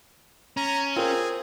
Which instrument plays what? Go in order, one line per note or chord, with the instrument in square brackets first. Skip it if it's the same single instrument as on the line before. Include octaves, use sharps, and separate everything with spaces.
[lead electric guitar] C#4 [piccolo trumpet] A#5
[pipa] C4 [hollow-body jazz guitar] F4 A#4 [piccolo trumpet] G#4